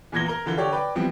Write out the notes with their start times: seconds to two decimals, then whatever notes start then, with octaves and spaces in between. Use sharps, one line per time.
0.12 E2 A#2 E3 G#6 A#6 G7
0.26 A#4 A#5 G7
0.46 D3 E3 F4 G7
0.57 D3 D4 G4 C#5
0.72 B4 D5 G5
0.95 E3 F3 G3 B3 C4